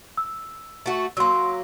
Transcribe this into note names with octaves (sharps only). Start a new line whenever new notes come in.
E6
A3 F#4
F#3 A#3 C6 E6